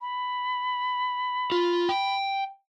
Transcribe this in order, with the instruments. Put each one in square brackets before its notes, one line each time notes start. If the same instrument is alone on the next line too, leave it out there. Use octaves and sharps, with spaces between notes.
[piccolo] B5
[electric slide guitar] F4
G5